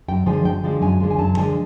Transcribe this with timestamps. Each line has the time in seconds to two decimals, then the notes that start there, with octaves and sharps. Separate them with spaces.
0.08 F#2 G5
0.26 D3 F3 G#3 G#5
0.45 F#2 G5
0.64 D3 F3 G#3
0.82 F#2 G#5
1.00 D3 F3 G#3
1.11 G#5
1.19 F#2 A5
1.37 D3 F3 G#3 G#5